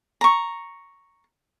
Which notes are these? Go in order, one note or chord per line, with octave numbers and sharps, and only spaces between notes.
A#5 C#6